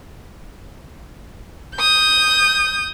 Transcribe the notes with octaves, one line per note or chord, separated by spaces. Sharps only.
D#6 G6